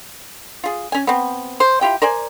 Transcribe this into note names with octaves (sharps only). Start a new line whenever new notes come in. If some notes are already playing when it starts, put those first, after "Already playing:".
F4 G#4
C#4 G#5
B3 C4
C5
E4 F4 G4 G5
A#4 C5 D5 G#5